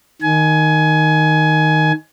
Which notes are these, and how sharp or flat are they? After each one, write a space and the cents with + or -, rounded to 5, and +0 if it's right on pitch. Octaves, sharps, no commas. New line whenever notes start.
D#3 +0 G#5 +20